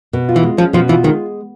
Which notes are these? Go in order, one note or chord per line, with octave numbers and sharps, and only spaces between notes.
B2
F4
E3
G#3
F3 C#4
B2 F3
E3 F4
D#3 G#3